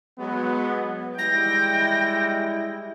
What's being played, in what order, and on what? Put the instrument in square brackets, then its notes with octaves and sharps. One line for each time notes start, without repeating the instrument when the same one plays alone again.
[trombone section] F#3 G#3 B3
[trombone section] G3 G#3 E4 [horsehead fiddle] G5 [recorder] A#6